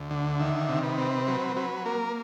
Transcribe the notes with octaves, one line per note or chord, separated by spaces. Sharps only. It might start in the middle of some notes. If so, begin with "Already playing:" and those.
Already playing: D2
D3
D#3 E5
C3
B4
C4
F#3 B4
F#3 B4
A#3 A#4